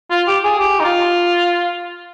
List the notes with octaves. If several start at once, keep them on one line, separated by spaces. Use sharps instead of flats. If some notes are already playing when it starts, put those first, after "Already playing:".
F4
G4
G#4
G4
D#4
F4